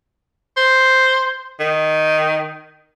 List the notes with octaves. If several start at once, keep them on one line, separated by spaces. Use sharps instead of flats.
C5
D#3